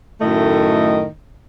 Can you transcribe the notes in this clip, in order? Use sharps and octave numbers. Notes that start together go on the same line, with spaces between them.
F#2 A2 D#3 A3 D#5